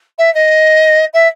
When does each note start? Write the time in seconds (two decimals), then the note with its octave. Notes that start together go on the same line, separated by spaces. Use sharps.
0.18 E5
0.34 D#5
1.13 E5